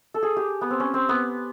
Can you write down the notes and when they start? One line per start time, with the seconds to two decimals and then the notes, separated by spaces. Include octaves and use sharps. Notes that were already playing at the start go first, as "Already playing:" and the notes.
0.14 A4
0.23 G#4
0.37 G4
0.61 B3
0.70 C4
0.80 C#4
0.94 C4
1.09 B3